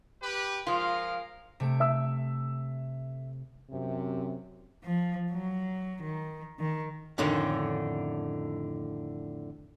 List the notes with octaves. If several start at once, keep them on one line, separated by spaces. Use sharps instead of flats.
G4 B4
F3 G#3 F4 A#4 F5
C3 A3 D7
E5 E6
F#2 C3
F3
F#3
D#3
D#3
F2 A2 D3 D#3 A3 C#4